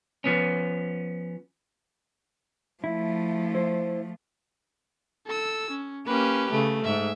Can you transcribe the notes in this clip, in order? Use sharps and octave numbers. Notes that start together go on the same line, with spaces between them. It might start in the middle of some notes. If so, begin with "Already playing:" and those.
F3 B3 C#4
F3 A3 E4
E4 C5
A4 E6
C#4
A#3 C#4 G4 B4
C#3 A3
G#2 E5